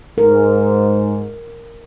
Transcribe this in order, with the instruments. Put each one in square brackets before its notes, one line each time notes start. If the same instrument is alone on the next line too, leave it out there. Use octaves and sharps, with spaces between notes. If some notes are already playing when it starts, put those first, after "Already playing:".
[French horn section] G#2 [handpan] A#4